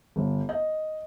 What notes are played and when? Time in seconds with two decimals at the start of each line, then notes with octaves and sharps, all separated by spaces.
0.16 G1
0.49 D#5